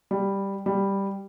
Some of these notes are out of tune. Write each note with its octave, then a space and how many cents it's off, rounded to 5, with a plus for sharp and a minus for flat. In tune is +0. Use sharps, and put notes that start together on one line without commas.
G3 +5
G3 +5